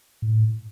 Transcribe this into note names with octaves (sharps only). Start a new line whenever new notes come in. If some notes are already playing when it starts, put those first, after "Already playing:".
A2